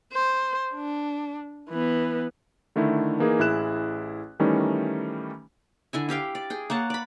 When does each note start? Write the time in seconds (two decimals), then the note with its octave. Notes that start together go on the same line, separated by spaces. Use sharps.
0.13 C5
0.75 D4
1.69 E3 B3
2.76 D3 D#3 A3 D4 E4
3.20 E3 A#3 D#4 G#4 A#4
3.39 A1 E4 G#4 F#6 E7
4.39 D#3 E3 G3 A3 C#4 D#4
5.93 D3 E4 G#5
6.09 E4 G4 F5 G5
6.35 D5
6.50 G#4 G5
6.70 A#3 C#5 F#5 A5
6.90 D5 B5